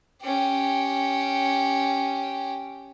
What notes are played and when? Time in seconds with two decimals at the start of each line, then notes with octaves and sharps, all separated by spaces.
0.22 C#4 G4